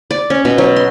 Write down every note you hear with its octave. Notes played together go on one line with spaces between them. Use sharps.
D5
C#4
B2
F#3
C6